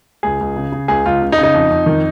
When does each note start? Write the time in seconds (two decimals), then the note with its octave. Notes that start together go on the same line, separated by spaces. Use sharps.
0.23 C#2 G#4
0.41 C#2
0.56 C#3
0.72 C#3
0.88 C#2 G#4
1.06 C#2 F4
1.22 C#3
1.32 D#4
1.38 C#3
1.43 D#4
1.54 F2
1.71 F2
1.86 D#3